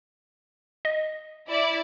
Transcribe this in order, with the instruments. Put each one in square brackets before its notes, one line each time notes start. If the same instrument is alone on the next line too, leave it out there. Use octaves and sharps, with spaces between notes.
[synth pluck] D#5
[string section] E4 D5